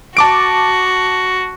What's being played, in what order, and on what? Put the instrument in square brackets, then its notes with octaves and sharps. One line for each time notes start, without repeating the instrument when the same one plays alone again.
[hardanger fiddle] F#4 [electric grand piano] A5 D6 D7